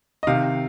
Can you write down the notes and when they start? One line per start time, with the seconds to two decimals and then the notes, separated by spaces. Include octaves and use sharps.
0.23 D#5
0.27 C3 D#3 F5